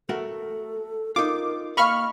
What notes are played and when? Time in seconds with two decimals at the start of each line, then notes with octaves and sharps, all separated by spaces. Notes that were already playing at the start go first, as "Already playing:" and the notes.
0.09 A3 F#4 A4 A#4
1.16 D#4 F4 A#4 D6
1.77 A#3 D#5 F5 B5 C#6 F6